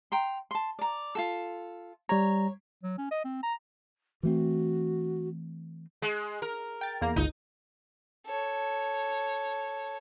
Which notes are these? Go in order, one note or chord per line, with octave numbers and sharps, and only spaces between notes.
G5 A#5 C6
A5 C6
D5 A#5
F4 F#4 A4
G3 C#5 A#5
F#3
C#4
D#5
C4
A#5
E3 A3 C4 F#4
G#3
A#4
G5 A6
E2 A#3 A#5
G1 C#2 D#4
A4 C#5